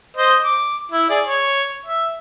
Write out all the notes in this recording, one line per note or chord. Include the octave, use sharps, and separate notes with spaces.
C5 D#5
D6
E4
G#4 D5
C#5
E5